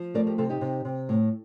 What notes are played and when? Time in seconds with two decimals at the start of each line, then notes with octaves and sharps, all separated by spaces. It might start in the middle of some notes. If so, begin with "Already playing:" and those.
Already playing: F3
0.14 A3 A#4 D5
0.27 G4 A#4
0.38 C3 F4 A4
0.50 D#4 G4
0.61 C3
0.85 C3
1.09 A2